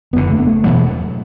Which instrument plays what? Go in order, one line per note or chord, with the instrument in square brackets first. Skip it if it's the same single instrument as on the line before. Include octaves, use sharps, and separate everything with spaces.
[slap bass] F#1 [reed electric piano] B3
[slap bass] E2 D3
[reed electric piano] A3
B3
A3
[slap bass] E1 E2 B2 F#3